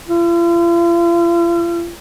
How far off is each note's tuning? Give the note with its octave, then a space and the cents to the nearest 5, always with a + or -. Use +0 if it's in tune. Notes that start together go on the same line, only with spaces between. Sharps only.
F4 -45